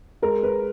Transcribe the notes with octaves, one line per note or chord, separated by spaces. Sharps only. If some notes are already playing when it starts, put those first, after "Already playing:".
G#3 A#4
B4